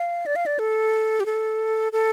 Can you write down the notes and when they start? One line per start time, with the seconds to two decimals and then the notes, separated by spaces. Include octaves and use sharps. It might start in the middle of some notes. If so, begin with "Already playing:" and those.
Already playing: F5
0.26 D5
0.36 F5
0.46 D5
0.59 A4
1.20 G4
1.26 A4
1.92 A4